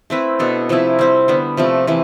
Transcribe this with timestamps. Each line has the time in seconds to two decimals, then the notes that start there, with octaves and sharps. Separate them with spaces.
0.10 A3 C4 E4 B4
0.39 B2 B3 D4 A4
0.69 C3 F3 A3 E4
0.99 G3 C4 G4
1.28 D3 G3 B3
1.57 C3 F3 A3
1.87 C3 E3 A3